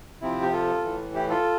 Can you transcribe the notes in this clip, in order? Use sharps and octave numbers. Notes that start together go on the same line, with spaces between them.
C3 F3 C4 E4
G4
F4 A4
A2 E3
E4 G4
F4 A4